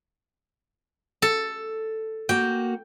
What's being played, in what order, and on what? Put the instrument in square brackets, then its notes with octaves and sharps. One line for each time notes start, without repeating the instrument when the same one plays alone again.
[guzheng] A4
[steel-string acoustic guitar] A#3 F#4 [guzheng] G5